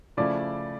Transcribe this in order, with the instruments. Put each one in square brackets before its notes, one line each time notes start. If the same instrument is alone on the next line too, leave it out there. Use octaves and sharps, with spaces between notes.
[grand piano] C#3 F3 A3 E4 [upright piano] D5